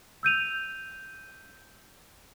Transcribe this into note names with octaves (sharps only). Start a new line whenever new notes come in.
E6 G6 D#7 F7